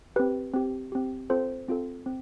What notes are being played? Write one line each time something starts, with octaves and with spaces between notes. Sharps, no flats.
C4 G4 B4
C4 G4
C4 G4
C4 F4 A4 C5
C4 F4 A4
C4